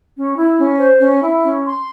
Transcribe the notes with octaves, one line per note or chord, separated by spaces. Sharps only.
C#4
E4
C#4
C5
C#4
E4
C#4
C6